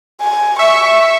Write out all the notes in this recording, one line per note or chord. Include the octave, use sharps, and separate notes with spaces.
G#5
E5 C#6